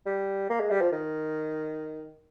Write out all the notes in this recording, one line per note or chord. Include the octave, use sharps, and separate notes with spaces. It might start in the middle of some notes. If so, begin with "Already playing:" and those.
G3
A#3
G#3
G3
F3
D#3